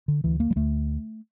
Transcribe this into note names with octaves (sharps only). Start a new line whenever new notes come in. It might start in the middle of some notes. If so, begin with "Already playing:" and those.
D3
D2 E3
A#3
G3
D2 A3